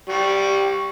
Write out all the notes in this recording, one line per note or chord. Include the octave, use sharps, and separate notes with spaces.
G3 C#6